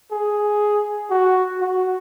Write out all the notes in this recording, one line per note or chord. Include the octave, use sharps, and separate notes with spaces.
G#4
F#4
F#4